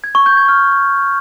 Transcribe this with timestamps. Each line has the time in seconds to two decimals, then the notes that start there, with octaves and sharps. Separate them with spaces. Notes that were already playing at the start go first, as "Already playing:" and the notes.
0.04 G#6
0.15 C#6
0.26 G6
0.37 G#6
0.49 F6